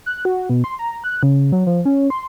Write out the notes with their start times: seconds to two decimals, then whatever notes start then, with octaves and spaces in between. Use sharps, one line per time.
0.06 F#6
0.25 F#4
0.50 B2
0.64 C6
0.79 A#5
1.04 F#6
1.23 C#3
1.52 F#3
1.66 F3
1.85 C#4
2.10 C6